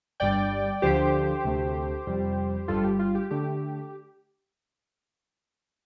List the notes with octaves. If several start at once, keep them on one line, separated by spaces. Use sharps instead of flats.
G1 G2 G3 D5 G5
D2 D3 F3 G4 C5
D2 C3 A3
F2 C3 G3
G1 G2 G3 F4 A4
G4
F4
G4
D3 A3 G4